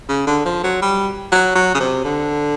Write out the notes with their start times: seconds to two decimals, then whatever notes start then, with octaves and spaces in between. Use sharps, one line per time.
0.09 C#3
0.27 D3
0.45 F3
0.64 F#3
0.82 G3
1.32 F#3
1.56 F#3
1.75 C#3
1.80 C3
2.05 D3